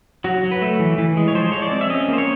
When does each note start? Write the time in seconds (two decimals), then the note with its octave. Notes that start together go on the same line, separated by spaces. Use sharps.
0.24 F#3 F#4
0.43 F#3
0.52 B4
0.62 A3
0.80 E3
0.98 E3
1.17 G#3
1.28 C#5
1.35 F3 C5
1.52 G#3 C#5
1.62 D5
1.72 C4
1.81 E5
1.90 C#4 D#5
2.08 A#3 C5
2.18 C#5